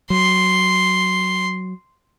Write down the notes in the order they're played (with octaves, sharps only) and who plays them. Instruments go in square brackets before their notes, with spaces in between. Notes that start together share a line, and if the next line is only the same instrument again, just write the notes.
[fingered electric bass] F#3 [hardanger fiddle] C6